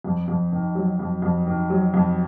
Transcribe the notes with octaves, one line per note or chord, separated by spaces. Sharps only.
F2
F2
D#3
F#3
F2
F2
D#3
F#3
F2